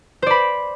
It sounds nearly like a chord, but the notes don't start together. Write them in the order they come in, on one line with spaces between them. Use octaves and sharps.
C5 D5 B5